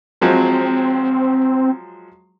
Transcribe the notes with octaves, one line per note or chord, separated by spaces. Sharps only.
F3 F#3 G#3 C4